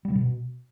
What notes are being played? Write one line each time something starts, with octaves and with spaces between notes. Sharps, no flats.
G3
C#3
B2